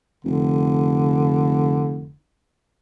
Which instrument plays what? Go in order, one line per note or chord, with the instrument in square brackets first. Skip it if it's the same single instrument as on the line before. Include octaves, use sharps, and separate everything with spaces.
[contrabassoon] F1 [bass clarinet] D3